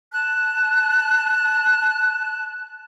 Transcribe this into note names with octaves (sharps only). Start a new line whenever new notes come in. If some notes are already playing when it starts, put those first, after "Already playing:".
A5 F#6